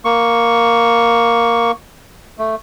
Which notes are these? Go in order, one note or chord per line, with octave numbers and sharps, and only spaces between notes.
A#3 C#6
A3